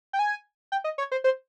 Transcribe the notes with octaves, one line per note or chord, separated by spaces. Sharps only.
G5
G#5
G5
D#5
C#5
C5
C5